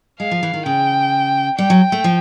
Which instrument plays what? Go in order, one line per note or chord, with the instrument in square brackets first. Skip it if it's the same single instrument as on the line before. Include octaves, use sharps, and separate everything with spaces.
[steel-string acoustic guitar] G#3 [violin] F5
[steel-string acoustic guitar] F3
E3
D#3
[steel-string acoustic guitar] C#3 [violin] G5
[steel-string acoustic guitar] G3 [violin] G5
[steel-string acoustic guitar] F#3
A3
F3